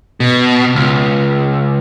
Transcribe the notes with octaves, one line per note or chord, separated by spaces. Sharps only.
B2
C#2